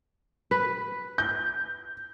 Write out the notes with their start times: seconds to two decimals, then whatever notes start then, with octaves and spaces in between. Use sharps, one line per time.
0.51 B4
1.18 G6